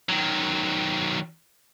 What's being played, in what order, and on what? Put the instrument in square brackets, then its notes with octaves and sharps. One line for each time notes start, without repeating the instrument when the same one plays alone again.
[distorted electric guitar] D#3 F#3